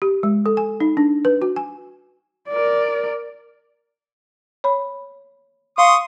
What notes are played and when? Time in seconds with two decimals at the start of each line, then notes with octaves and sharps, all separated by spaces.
0.02 G4
0.23 G#3
0.46 A4
0.57 G#5
0.80 D#4
0.97 D4
1.25 B4
1.42 F#4
1.56 G#5
2.49 A#4 D5
4.64 C#5 B5
5.78 F5 C6 C#6 D#6